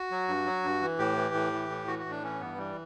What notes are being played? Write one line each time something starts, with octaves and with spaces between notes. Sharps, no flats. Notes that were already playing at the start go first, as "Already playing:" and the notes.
Already playing: F#4
F#3
G2
F#3
G2
E3
A2 G4
E3
A2
E3
A2
E3 F#4
F#4
A2
D4
E3 C#4
G2 B3
E3 G3